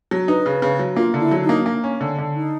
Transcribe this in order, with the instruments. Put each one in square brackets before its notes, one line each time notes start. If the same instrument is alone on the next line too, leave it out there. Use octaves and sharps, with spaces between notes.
[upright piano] F#3
[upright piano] D#4 [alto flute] B4
[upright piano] C#3
C#3
F#3
[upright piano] A#3 [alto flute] F4
[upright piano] D3
[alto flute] E4
[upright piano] F#3
[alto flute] D#4
[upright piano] A#3
A#3
C#4
D3
D3
[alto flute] D#4